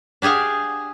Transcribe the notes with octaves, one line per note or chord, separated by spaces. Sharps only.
D4 G4 G#4 F5 F#5